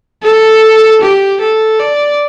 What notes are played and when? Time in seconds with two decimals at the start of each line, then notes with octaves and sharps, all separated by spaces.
0.22 A4
1.01 G4
1.41 A4
1.80 D5